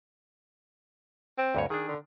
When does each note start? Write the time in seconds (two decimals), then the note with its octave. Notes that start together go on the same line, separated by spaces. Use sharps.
1.38 C4
1.55 D2 G2 C#5
1.70 D#3 D4 G#4
1.88 D3